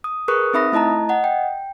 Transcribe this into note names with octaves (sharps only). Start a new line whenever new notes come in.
D#6
G#4 A#4 B4 C#6 D#6 F#6
C4 D#4 E5 B5 D#6 A#6
A3 E4 D#5 A5 A#5
D#5 F#5
G5